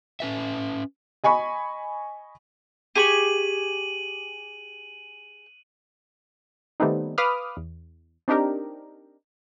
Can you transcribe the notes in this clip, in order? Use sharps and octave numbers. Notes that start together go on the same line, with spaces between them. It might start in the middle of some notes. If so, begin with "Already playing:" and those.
C#4 B4 E5
D#5 G#5 B5 C#6
G4 G#4 C#6 D#7 F#7
D#3 G3 A3 B3 C4 D#4
B4 F5 B5 D6 D#6 F6
E2
C4 D4 D#4 G4 A#4